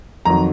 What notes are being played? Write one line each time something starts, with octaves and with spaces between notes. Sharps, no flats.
F2 D#3 F#3 A#5